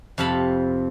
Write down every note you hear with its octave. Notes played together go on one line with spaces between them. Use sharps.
F2 C3 F5 A5 B5